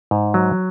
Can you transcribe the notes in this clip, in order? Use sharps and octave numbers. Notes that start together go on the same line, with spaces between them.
G#2
F#3